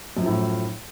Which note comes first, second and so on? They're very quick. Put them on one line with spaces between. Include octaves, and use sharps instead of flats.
F#2 F3 A2